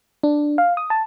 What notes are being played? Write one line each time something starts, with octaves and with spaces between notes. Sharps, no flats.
D4
F5
D#6
A5